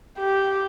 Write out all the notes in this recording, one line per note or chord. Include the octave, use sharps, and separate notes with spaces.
G4